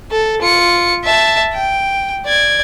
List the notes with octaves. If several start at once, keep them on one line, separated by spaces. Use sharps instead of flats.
A4
F4 C#7
E5 A5
G5
D5 G#6